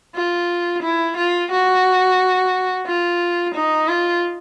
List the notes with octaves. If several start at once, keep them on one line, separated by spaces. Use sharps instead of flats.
F4
E4
F4
F#4
F4
D#4
F4